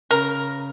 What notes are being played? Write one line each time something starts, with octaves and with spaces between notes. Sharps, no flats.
C#3 A#4